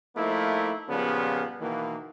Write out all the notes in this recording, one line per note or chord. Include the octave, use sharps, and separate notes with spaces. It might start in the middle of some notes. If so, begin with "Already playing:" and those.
F3 A3 A#3 D#4 E4
A#2 C#3 F3 G3 B3
B2 D#3 E3 A#3